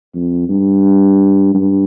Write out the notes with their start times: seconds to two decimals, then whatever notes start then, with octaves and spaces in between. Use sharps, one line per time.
0.15 F2
0.49 G2
1.55 G2